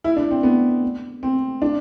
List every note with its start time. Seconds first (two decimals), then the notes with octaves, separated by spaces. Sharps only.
0.04 E4
0.17 D4
0.31 C4
0.43 B3
1.23 C4
1.62 D4